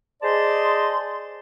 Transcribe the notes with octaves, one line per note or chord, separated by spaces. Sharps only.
G#4 C5 D5 D#5 A5 C6